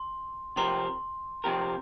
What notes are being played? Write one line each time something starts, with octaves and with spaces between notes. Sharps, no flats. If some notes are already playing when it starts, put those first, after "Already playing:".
Already playing: C6
C3 F3 C4 G4 A#4 C6
C3 F3 C4 G4 A#4